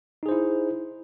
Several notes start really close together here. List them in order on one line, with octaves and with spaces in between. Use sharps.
D#4 G#4 C5 E4